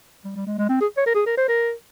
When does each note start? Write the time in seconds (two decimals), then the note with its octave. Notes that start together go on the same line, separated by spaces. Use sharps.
0.25 G3
0.36 G3
0.47 G#3
0.59 G#3
0.69 C4
0.81 G#4
0.97 C#5
1.07 A#4
1.15 G#4
1.26 A#4
1.37 C5
1.48 A#4